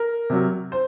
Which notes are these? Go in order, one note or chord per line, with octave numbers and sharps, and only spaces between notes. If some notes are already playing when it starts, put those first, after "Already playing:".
Already playing: A#4
C3 F#3
C5